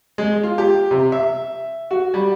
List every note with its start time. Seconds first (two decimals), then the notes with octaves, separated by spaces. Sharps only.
0.18 G#3
0.43 F4
0.58 G4
0.91 C3
1.12 E5
1.91 F#4
2.14 G3